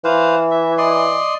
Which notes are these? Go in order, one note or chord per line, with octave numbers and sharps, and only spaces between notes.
E3 B4 C5 F5
E5
D5 D#5 C6